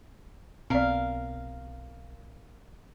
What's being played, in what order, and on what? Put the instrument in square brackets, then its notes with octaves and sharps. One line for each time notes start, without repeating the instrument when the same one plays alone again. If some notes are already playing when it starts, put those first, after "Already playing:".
[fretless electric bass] B1 B2 [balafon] C4 D5 [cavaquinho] A#4 F5